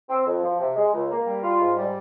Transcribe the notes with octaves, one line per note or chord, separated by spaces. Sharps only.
C4
F2
F3
C3
G#3
C#2
A#3
G3
F4
G#2
G3